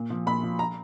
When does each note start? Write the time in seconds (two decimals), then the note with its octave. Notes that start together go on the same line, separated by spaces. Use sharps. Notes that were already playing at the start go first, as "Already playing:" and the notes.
Already playing: A#2
0.10 F3
0.26 A#2 B5
0.43 F3
0.59 A#5